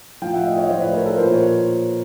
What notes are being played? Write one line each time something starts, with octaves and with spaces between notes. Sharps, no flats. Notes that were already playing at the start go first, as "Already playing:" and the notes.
A2 F3 F5 G5
E5 F#5
D#5 F5
E5
C#5 D#5
A2 F3 C5 D5
B4 C#5
A#4 C5
A4 B4
A#2 F3 A#4 C5
B4 C#5